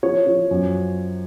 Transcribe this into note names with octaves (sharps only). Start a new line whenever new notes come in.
F3 C#5
F3
F#2